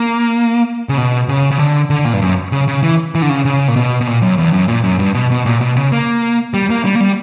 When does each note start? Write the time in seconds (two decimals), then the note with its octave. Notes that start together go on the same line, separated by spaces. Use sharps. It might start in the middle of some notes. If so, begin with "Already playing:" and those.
Already playing: A#3
0.89 C#3
0.98 B2
1.28 C#3
1.51 C#3
1.59 D3
1.90 D3
2.05 A#2
2.14 G2
2.22 F#2
2.52 C#3
2.68 C#3
2.83 E3
3.15 E3
3.22 D3
3.29 C#3
3.45 C#3
3.68 A#2
3.76 B2
4.01 B2
4.07 A#2
4.22 F#2
4.38 E2
4.53 F#2
4.68 A#2
4.84 F#2
4.99 G2
5.15 B2
5.31 B2
5.46 A#2
5.61 B2
5.77 C#3
5.92 A#3
6.54 G3
6.70 A#3
6.85 G3
6.95 A#3
7.01 G3